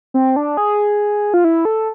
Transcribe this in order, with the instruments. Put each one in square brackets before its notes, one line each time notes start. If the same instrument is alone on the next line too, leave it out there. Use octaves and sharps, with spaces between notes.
[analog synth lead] C4
D4
G#4
F4
E4
A4